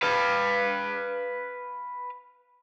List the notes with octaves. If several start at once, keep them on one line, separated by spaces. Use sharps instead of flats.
B4 F5